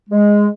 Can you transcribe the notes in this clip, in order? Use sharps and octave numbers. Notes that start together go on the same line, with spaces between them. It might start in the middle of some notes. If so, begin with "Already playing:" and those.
G#3